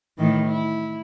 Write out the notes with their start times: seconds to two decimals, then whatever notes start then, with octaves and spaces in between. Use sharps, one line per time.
0.18 A2 D#3 E3
0.46 E4